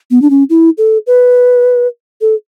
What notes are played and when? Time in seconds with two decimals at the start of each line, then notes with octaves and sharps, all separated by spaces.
0.11 B3
0.22 D4
0.30 C#4
0.50 E4
0.78 A4
1.07 B4
2.21 A4